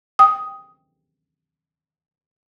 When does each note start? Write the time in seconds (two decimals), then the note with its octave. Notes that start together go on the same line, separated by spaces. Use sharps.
0.19 G5 D#6